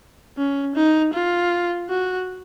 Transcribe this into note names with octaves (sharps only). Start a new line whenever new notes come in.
C#4
D#4
F4
F#4